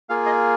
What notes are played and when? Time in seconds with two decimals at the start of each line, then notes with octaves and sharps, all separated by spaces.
0.09 A#3 F4 G#4 F5
0.26 D#5